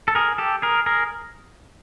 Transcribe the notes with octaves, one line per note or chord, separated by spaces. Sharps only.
A4
G#4 A#4
G4 A4
G#4 A#4
G#4 A#4